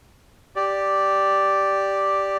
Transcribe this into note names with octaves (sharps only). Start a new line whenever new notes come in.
G4 D5